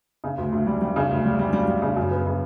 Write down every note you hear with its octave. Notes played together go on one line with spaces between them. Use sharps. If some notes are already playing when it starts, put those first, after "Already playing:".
C#3
D2
D2
G3
G3
C#3
D2
G3
G3
G3
G3
C#3
F#2
B3
C#3